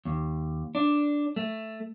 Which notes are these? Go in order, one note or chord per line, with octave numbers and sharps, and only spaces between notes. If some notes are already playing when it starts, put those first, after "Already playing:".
D#2
D4
A3